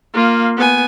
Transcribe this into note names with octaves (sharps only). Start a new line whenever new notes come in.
A#3 F4
B3 G#5